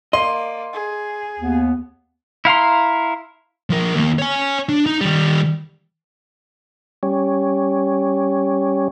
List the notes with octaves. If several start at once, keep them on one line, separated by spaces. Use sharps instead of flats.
A#3 D5 D#5 C6
G#4
D#2 B3
E4 F5 A#5 C6
F3 A#4
D#2 A#3
C#5 G#5
D4
D#4
D#3 G3
G3 C#4